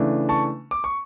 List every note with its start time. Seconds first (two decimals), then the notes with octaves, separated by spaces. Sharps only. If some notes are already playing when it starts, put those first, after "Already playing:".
Already playing: C#3 E3 A3 D4
0.29 A5 C#6
0.71 D6
0.84 C#6